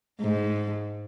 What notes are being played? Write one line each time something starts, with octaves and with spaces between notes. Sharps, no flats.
G#2